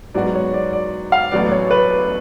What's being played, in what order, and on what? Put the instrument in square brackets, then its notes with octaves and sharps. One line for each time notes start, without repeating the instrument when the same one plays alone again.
[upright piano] G#2 F#3 B3 F#4 [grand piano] D5
[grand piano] C#5
D5
D5
F5
[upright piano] A1 A2 F#3 B3 [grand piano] D5
[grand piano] C#5
B4